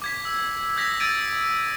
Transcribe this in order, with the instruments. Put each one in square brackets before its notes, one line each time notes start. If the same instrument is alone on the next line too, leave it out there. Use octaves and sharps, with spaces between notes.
[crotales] D6 G#6 B6
E6
D#6 E6 G6 G#6 A#6 B6
E6 G#6 A6 D7 D#7